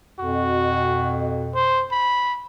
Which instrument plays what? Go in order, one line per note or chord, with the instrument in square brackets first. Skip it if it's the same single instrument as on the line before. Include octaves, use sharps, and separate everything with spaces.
[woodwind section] F2 B2 [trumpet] F#4
[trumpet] C5
B5